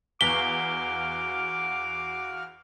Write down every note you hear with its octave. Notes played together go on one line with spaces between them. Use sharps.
E2 F#4 F5 D6 B6 G7